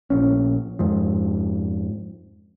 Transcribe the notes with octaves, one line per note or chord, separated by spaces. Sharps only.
A#1 C#4
F2 G#2 F3